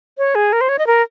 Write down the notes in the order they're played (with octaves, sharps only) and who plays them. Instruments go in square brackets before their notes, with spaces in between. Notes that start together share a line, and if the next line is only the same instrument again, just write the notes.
[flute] C#5
G#4
A#4
C5
C#5
D#5
A#4